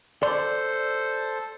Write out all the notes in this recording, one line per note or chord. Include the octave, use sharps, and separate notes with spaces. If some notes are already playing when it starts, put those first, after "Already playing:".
A4 C5 D5 C6